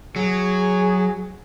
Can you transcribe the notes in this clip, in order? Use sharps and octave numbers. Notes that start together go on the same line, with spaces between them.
F#3 G#4